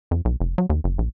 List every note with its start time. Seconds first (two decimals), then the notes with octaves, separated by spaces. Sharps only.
0.11 F2
0.25 B1
0.40 F1
0.58 F#3
0.70 D#2
0.84 F#1
0.98 A#1